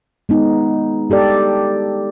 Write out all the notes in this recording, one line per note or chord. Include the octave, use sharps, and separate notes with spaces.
G#3 B3 D#4
G#3 G4 A4 D5